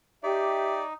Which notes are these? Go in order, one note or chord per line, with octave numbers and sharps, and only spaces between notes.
D#4 G4 D5 E5